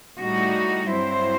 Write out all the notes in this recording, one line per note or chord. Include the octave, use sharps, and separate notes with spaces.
A2 G3 D#4 F#4
G2 F#3 C4 E4 C5